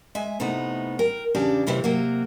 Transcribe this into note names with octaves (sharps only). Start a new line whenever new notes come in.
G#3 E5 G#5
A2 C3 A3 B3 D#4
A#4 G5
E2 C#3 D4 G4 A5
F2 A2 C3 E3
C3 F#3 A#3